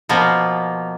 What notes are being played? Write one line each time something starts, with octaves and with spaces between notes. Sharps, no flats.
B2 F3 A#3